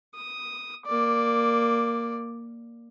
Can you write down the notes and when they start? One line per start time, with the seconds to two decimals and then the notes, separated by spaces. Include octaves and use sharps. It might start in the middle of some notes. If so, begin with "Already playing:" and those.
0.15 D#6
0.87 A#3 D5